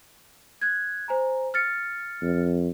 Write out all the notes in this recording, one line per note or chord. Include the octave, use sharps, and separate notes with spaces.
F#6 G#6
C5 G#5 A#5
F6 A6 C#7
F2